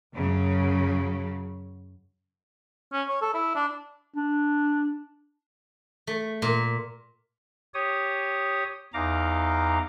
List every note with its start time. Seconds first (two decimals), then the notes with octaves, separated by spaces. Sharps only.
0.15 F#2 C#3 F#3
2.93 C#4
3.09 C#5
3.21 A4
3.34 E4
3.55 D4
4.15 D4
6.07 A3
6.42 A#2
7.74 G4 C#5 D#6
8.94 E2 D#4 F5 A#5 D6